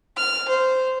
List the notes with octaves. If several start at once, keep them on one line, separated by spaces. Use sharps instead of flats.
F6
C5